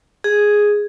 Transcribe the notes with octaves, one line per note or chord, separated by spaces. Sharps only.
G#4